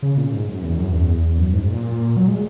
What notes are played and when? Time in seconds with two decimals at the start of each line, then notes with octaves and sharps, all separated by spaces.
0.03 C#3
0.18 A#2
0.33 G#2
0.48 F#2
0.63 E2
0.78 F#2
0.93 E2
1.38 F#2
1.53 G#2
1.63 G#2
1.68 A#2
2.17 F#3
2.28 G#3